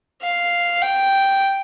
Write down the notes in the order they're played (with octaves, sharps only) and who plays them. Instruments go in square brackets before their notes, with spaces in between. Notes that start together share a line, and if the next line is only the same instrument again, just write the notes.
[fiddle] F5
G5